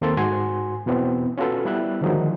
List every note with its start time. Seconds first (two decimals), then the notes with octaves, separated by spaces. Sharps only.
0.01 D#2 A#3 C4 A4 C6 A6
0.17 G#2 F#4 G#5 C6
0.86 E2 B2 E3 B3 C4
1.38 C#4 F4 F#4 A4 B4
1.65 G3 B3 E4 E5 F#6
2.01 D3 D#3 F3 F#3 G#3 D#4